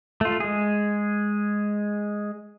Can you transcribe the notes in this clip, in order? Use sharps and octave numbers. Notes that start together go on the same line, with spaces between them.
A3 F4
G#3 G#4